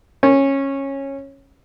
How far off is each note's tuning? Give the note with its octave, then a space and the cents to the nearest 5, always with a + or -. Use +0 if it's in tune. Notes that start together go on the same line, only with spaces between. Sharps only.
C#4 -15